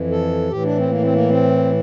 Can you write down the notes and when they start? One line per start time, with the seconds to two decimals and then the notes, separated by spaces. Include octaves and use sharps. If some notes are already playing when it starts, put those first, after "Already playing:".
Already playing: F2 E3
0.11 A4
0.50 A2 E3 G4
0.63 D4
0.77 C4
0.90 A#3
1.02 C4
1.13 A#3
1.29 C4